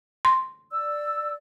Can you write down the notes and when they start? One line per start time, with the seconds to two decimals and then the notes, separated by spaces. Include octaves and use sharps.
0.25 C6
0.72 D5 E6